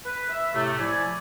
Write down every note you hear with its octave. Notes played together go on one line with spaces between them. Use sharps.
B4
E5
A2 C3 A3
F3 E4 D5 G#5